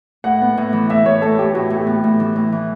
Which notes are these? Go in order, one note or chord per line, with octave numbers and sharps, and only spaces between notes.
A2 F#5
B3
A2
E3
A2 E5
A2 C#5
A2 A4
A2 G4
A2 F#4
A2
G4
B3
G4
A2
E3
A2
E3